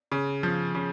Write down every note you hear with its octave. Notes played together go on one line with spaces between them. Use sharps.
C#3
F3
C#3